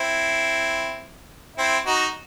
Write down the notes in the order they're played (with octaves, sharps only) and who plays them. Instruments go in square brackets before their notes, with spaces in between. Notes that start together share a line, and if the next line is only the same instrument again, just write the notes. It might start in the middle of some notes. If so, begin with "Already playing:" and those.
Already playing: [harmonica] C4 E4
C4 E4
D#4 F#4